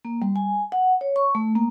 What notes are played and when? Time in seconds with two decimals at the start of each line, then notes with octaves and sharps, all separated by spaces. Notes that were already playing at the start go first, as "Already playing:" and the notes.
0.05 A#3
0.22 G3
0.36 G#5
0.72 F#5
1.01 C#5
1.16 C#6
1.35 A3
1.56 A#3